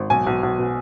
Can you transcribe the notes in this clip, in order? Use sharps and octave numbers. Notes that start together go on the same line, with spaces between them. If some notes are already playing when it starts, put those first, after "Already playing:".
Already playing: G#1
B1 G#5
B1
B1
B2